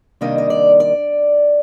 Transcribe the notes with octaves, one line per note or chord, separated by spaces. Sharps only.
C3 D#3 G3 A#3 D4 D#5
D#5
D5
D5